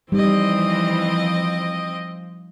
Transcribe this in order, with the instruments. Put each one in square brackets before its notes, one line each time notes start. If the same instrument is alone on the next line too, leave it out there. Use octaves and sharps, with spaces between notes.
[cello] E3 [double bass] F3 [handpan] G3 D#4 [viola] C4 D#5